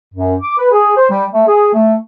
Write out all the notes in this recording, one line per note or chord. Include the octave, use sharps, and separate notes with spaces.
F#2
D6
B4
G#4
C5
G3
A3
G#4
A3